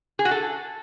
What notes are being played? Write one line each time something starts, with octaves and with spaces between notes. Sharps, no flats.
G#4
F#4
A4